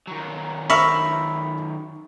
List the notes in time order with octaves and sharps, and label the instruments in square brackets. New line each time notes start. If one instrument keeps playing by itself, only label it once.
[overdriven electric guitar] D#3 F#3
[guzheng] A#4 E5 F5 [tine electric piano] B5 [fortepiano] C#6